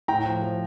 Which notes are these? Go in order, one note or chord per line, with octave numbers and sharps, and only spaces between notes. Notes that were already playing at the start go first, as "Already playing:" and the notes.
A2 G5 A#5
F3
F3